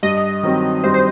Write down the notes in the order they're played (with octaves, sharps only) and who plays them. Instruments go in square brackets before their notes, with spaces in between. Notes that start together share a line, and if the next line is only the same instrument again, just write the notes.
[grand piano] G2 [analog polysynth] D#5
[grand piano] D#3 F#3 C4
[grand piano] G2 [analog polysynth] C5
[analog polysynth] C5